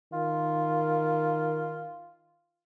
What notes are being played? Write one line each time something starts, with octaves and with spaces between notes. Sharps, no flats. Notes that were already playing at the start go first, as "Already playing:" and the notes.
D#3 F4